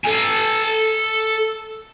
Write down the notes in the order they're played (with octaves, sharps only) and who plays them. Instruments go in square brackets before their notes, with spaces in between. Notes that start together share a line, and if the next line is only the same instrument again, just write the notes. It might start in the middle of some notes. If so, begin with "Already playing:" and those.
[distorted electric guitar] A4 G#5